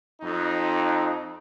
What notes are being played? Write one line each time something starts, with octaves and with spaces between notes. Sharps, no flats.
F2 D#4